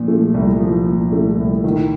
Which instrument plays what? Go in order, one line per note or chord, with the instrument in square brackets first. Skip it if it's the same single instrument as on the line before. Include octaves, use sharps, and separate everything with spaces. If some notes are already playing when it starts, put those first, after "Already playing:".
Already playing: [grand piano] A#2 F3
A3
C2
F3
A#2
A3
C2
D#3